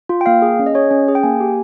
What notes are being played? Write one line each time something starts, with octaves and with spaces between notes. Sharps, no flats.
F4
G5
A#3 F5
G#4
C#4
D#5
G#4 C#5
C#4
G#4
G5
A#3 G#5
G4